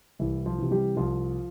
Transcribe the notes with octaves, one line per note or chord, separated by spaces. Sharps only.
C2 E3 E4
F3 F4
C3 E3
G3 G4
C2 F3 F4